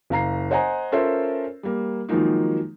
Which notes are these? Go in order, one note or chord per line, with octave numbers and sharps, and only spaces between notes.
F#1 F5 A#5 C7
C5 D#5 F#5 G#5 A#5
C#4 F4 A4 A#4 C5 E5
G3 A#3
D#3 F3 F#3 G#3 A#3 D#4